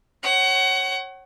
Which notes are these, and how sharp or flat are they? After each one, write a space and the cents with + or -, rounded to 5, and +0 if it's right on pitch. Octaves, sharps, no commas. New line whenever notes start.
C#5 -20 F#5 +30